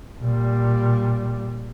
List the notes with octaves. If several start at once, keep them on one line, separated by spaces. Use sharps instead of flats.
A#2 G3